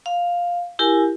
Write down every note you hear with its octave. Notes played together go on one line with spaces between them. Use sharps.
F5
E4 G4 A#4 G#5